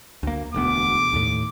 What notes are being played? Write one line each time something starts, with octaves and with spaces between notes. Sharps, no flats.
D2 A#3
E1 D2 B3 D6
D#2 A2